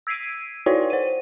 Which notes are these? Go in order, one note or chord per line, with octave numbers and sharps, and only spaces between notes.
E6 G#6 B6 C7 D7 D#7
D#4 E4 F#4 B4 C#5 D5
C5 D#7